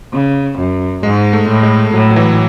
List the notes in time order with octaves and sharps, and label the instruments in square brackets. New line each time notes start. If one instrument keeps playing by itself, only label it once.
[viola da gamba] C#3
F#2
[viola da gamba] G#2 [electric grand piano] G#3
[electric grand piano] A3
[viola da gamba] A2
[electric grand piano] G#3
[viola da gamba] A2 [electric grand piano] F#3
[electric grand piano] F#3
E3